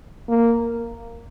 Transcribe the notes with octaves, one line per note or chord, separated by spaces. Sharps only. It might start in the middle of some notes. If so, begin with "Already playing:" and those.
A#3